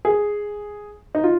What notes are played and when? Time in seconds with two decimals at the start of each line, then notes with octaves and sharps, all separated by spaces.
0.05 G#4
1.15 D#4
1.24 F4